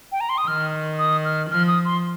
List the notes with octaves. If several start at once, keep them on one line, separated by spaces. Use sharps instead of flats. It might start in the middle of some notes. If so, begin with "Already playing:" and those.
G5
A#5
C6
D#6
D#3 F6
D#6
F6
F3 F6
D#6
C6